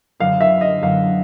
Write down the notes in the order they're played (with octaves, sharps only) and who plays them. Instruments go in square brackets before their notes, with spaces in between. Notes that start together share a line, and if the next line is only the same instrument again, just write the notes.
[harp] F#2 D3 F#3 B3 [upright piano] F5
[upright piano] E5
D#5
[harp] F#2 D3 F#3 B3 [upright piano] F5